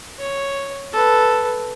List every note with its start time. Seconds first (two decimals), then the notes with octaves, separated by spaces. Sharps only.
0.19 C#5
0.93 A4 B4